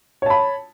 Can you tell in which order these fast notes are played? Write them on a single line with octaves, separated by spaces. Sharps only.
C#5 A5 B5